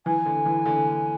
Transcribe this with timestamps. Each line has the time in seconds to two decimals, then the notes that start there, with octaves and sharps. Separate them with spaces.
0.05 E3 G#5
0.25 D3
0.45 E3
0.65 D3